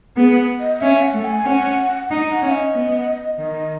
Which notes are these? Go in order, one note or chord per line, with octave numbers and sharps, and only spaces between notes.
B3 G#4
D#5
C#4 E5
F#5
A3
G#5
C#4 F#5
D#4
F#5
C#4
D#5
B3
D#3 D#5